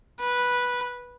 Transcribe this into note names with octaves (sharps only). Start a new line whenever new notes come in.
B4